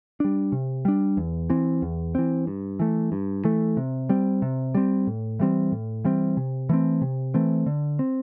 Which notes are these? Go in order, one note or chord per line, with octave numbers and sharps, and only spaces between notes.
G3 D4
C3
G3 D4
E2
E3 C4
E2
E3 C4
G2
E3 A3
G2
E3 A3
C3
G3 C4
C3
G3 C4
A2
E3 G3 C4
A2
E3 G3 C4
C3
E3 A3 C4
C3
E3 A3 C4
D3
C4